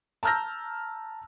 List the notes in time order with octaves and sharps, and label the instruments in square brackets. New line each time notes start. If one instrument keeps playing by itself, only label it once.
[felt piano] A5 A#5 E6 F6 G6 A#6